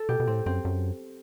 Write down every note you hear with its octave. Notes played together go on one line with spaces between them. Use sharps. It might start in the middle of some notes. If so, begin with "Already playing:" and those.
Already playing: A4
B2 G4
B2
A2 C4
F#2 C4
F#2